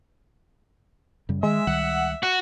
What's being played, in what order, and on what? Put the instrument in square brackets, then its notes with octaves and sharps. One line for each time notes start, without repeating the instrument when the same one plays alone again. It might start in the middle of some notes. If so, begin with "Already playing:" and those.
[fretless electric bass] F#2 C#3 G3
[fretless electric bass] D#3 [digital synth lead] G#3 [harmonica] E5
[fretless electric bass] C#2 D#3 G3 [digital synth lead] F#5
[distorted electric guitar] F#4 [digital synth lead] F#5